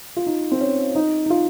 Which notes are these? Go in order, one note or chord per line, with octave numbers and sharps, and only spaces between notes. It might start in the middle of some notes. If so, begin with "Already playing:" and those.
F4
D#4
C4
C#4
D#4
D#4
F4